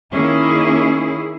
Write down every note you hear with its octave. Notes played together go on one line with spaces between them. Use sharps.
D#3 A#3 C#4 E4 G#4